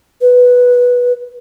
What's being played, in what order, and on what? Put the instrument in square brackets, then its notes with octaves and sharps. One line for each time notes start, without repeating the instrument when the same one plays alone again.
[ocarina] B4